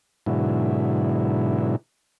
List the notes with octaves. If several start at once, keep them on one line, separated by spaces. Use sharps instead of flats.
G#2 B2 D3 F#3 E4